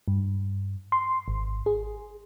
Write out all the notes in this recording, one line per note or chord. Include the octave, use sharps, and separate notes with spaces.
G2
C6
G#1
G#4